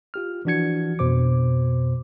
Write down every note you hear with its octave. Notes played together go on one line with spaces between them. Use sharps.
F4 G4 F6
E3 F3 D4 F#4 G#6 C#7
F2 B2 C5 D6